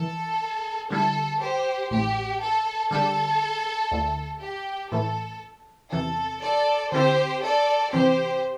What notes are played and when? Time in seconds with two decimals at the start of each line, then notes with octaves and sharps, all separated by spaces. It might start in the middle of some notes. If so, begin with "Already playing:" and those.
Already playing: E3 A4
0.90 D3 G3 E4 A4
1.40 G4 C5
1.91 A1 A2 A3 G4
2.41 A4
2.90 D3 G3 D4 G4 A4
3.92 D2 D3 A3 E4
4.41 G4
4.91 A2 E3 A3 E4 A4
5.92 E2 C3 E3 A4
6.42 A4 D5
6.92 D3 C4 E4 G4 A4 C5
7.42 A4 D5
7.93 C3 E3 C4 G4 C5